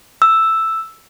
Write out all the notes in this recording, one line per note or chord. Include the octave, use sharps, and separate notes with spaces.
E6